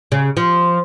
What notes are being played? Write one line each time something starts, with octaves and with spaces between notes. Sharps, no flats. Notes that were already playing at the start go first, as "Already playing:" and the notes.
C#3
F3